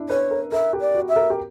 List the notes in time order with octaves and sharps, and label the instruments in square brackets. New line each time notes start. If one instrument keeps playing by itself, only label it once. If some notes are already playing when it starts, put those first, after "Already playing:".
Already playing: [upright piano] D4 E4
[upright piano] B4 [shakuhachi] C#5
[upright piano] A#4
[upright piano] A#4 [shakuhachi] E5
[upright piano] G4
[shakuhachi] D5
[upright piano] F#4
[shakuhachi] E5
[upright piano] A#4
G4